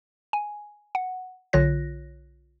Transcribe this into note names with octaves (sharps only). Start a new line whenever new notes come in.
G#5
F#5
B1 D3 F4 C#5 F#6 A#6